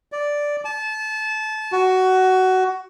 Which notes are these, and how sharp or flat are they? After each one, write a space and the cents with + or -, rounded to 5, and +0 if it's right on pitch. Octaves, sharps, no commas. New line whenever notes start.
D5 -5
A5 -25
F#4 +15